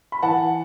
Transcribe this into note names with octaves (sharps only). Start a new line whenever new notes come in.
B5
E3 F#5 A5